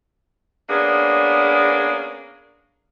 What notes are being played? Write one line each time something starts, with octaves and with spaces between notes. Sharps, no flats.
A#3 B3 C#4 D4 G#4